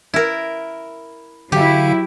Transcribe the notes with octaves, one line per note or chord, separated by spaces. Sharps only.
E4 A#4
D3 F#3 E4 G4 F5